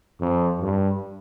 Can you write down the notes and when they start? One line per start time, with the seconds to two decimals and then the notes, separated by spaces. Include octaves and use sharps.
0.20 F2
0.61 G2